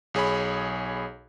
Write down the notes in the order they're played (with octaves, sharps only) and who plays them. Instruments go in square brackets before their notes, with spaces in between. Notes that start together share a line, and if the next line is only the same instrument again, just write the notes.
[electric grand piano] B1 G#4 C#5 B5